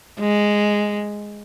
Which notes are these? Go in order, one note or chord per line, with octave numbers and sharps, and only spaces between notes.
G#3